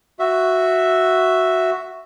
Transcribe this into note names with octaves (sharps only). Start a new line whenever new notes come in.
F#4 E5